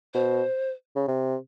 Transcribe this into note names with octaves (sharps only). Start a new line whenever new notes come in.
B2 C5
C#3
C3